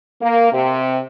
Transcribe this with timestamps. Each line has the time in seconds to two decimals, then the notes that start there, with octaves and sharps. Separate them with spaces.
0.22 A#3
0.53 C3